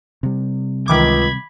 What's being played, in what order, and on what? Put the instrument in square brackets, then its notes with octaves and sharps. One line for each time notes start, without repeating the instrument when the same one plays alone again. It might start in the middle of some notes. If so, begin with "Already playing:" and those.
[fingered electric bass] C3 G3
[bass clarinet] C#2 [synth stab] D#3 E3 D6 [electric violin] B5 G#6